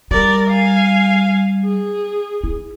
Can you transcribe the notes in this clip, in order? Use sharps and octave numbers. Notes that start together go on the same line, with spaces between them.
G3 A#4 D5
F5 G#5
G#4
E4